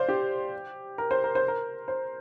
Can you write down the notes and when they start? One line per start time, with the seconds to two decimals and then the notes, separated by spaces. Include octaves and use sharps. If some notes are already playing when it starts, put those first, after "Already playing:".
Already playing: C5 D5 F5
0.09 G4
0.98 A#4
1.11 C5
1.24 A#4
1.35 C5
1.48 A#4
1.88 C5